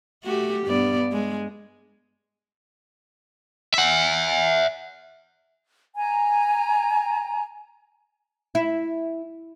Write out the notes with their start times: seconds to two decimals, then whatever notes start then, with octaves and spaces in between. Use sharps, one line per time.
0.24 A3 F#4 G4
0.67 G2 B3 D5
1.12 G#3
3.74 E5 F#5
5.95 G#5 A#5
8.55 E4